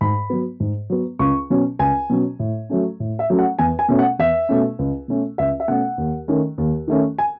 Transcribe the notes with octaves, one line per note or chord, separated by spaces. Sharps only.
G#2 B5
F#3 B3
G#2
F#3 B3
C#2 C#6
B2 F#3 C#4
C#2 G#5
B2 F#3 C#4
A2
F#3 A3 C#4
A2
E5
F#3 A3 C#4
F#5
E2 G#5
G#5
B2 A3 C#4
F#5
E2 E5
B2 A3 C#4
C#2
B2 A3 C#4
C#2 E5
E5
B2 A3 C#4 F#5
D#2
D#3 A3 C#4
D#2
D#3 A3 C#4
G#5